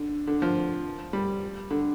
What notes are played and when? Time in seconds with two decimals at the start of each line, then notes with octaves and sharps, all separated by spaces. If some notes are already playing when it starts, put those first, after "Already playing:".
Already playing: D3
0.27 D3
0.42 F3
1.13 G3
1.71 D3